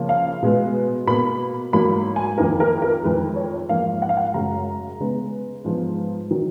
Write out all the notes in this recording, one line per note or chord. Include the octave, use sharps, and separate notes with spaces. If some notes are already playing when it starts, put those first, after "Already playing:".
Already playing: C#3 F3 A#3
F5
B2 G#3 B3
B2 A#3 B5
G#2 F#3 A#3 B5
G#5
F2 D#3 A#3 A#4
A#4
A#4
F2 D#3 G#3 B4
C#5
G#2 F3 A#3 F5
F#5
F5
F#5
F#2 C#3 G#3 A#5
C#3 G#3 B3
G#2 F3 G#3 B3
D#3 F#3